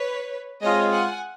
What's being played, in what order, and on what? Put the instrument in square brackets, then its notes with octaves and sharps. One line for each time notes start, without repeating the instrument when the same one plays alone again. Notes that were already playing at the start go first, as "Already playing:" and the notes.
Already playing: [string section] B4 C#5
[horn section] G#3 C4 F4 G#4 [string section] C#5 D#5
[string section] F#5 G#5